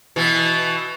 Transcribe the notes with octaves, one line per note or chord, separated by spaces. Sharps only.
B2 E3